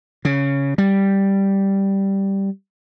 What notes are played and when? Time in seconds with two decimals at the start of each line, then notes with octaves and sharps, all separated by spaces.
0.25 C#3
0.78 G3